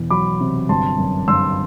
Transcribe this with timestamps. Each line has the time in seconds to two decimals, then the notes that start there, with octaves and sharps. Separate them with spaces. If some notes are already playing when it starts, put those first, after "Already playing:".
Already playing: E1 E2
0.10 F#3 B5 D6
0.40 C3
0.69 G1 A5 C6
0.99 F#2
1.28 G1 C6 E6